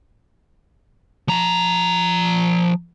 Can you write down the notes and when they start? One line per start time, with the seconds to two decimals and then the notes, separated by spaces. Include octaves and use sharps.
1.28 F3 A#5